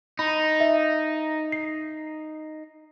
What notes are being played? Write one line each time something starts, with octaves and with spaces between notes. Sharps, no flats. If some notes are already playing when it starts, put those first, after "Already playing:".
D#4 B5
E5
C7